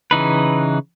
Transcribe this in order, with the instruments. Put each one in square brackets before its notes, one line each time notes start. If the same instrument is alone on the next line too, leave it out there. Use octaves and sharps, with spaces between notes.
[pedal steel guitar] C#3 E3 D#4 B4